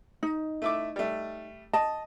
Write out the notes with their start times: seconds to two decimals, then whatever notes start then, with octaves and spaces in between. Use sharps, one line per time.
0.23 D#4
0.62 A3 E4 D6
0.96 G3 A3
1.73 D#5 A5